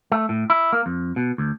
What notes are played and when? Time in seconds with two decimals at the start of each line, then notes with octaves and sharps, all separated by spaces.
0.12 A3
0.29 A2
0.50 E4
0.73 A#3
0.86 F2
1.16 B2
1.38 D2